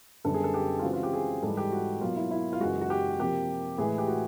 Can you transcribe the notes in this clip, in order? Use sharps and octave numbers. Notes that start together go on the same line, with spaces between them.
F#2 D3 G3 B3 A4
G#4
A4
G4
F4
C#3 E3 G#3 C4 F#4
F4
G4
G#4
G#2 E3 G3 A4
G4
F#4
B2 F#3 A#3 F4
E4
E4
F4
F#2 C#3 E3 G#3 F#4
F#4
G4
C3 F3 A#3 G4
A2 E3 G#3 G#4
G4
F#4